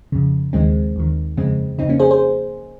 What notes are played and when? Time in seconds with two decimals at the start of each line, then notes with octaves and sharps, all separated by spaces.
0.12 F2 C#3
0.53 D#2 D#3 G#3 C4
0.96 D#2 D#3
1.37 F2 C#3 G#3 C4
1.78 C#3 C4 D#4
1.82 F2
1.89 A#3 C#4
1.99 G#4 C5
2.10 G#4 C5